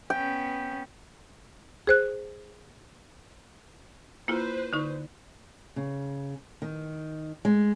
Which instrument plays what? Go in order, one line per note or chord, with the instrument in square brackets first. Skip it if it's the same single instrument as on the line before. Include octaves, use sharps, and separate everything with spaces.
[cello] B3 C#4 [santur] G5
[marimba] G#4 C5 F#6
[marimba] A#3 E4 F4 [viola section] B4 C5
[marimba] D3 D#4 C#6
[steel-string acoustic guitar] C#3
D#3
G#3